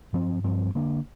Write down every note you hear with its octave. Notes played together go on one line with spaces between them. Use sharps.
G2 F3 C4
G2 F3 C4
D3 A#3 D4